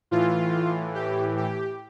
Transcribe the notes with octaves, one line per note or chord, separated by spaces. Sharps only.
A2 E3 F4
G4
G4